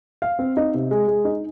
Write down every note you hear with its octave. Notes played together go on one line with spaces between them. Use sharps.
F5
C4
D#4
C3
G#3
G#3
D#4